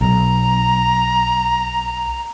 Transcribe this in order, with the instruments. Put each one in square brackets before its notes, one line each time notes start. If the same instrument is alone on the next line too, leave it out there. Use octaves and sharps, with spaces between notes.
[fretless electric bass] B1 [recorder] A#5